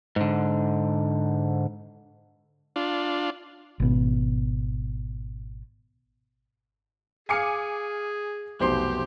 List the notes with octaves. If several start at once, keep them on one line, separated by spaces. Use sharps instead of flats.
G#2 D3
D4 F4
G#1 B2
G#4 F5 G#5 D6 F6 C7 C#7
F1 B1 B2 G4 C5 C6 C7